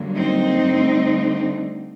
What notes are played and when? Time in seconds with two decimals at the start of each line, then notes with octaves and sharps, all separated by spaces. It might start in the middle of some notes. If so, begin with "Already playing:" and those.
Already playing: G2 D3 F#3 A#3
0.16 C4 D#4
0.63 G2 D3 A3